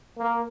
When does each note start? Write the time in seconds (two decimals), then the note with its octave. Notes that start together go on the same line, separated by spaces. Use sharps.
0.18 A#3